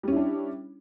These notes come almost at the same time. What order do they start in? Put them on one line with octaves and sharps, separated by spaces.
G3 C#4 E4 D4